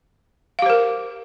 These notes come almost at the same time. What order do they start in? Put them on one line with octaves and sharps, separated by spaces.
F5 G4 C5 A#4